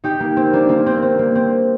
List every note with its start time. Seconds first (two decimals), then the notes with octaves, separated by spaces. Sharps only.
0.04 D#4 G4
0.20 A#3
0.37 C4
0.53 A#3 D4
0.69 A#3 D4
0.86 C4
1.02 C4
1.19 A#3
1.35 C4